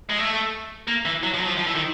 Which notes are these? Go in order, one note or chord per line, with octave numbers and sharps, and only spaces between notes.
G#3
A3
A#3
E3
F#3
F3
F#3
F3
F3
E3
D#3